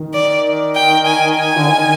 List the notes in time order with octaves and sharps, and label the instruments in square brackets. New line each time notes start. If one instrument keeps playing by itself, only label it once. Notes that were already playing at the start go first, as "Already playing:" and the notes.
Already playing: [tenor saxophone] D#3
[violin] D5
G5
G#5
G#5
[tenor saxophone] D3
D#3